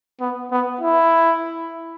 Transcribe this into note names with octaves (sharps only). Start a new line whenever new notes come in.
B3
B3
E4